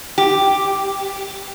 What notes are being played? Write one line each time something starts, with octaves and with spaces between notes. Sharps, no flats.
G4